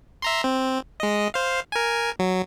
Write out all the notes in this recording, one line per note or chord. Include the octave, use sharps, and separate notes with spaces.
E5 A#5 C6
C4
G#3 D#5
C5 F5
A#4 G#5
F#3